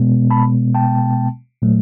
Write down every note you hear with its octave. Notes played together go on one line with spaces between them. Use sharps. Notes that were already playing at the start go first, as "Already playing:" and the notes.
Already playing: B2 G#3 B3
A5 B5
G5 A5
A#2 F#3 A3